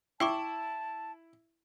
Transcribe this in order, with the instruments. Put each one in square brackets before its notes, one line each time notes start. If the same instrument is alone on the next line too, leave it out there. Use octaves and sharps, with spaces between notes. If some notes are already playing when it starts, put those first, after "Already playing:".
[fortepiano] E4 [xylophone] G5 C#6 D6 [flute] A5